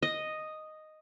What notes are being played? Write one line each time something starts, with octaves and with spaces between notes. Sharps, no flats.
D#5